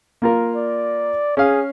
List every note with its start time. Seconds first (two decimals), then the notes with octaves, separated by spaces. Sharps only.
0.22 A#3 F4 A#4
0.55 D5
1.37 C#4 G#4 F5